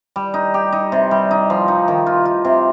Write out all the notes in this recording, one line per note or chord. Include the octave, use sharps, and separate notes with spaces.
G3
D#4
G4
D#4
C3
G3
D#4
F3
D#4
D#3
F4
F4
C3